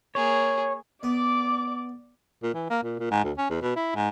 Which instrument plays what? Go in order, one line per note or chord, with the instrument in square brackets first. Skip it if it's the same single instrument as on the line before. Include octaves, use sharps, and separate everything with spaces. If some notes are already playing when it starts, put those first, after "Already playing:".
[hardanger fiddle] A#3 G#4 [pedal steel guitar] C#5
[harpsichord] B3 [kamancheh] D5 D6
[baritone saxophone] A#2
E3
A#3
A#2
A#2
G#2
D2
C#4
E2
B2
E4
G#2